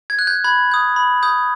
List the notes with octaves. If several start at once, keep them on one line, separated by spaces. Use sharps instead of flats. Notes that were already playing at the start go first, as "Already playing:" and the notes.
G#6
F#6
G6
B5 G#6
D#6 G6
B5
D#6 G6